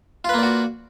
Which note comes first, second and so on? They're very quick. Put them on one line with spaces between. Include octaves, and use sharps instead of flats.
F4 B4 A#3 D5 F#4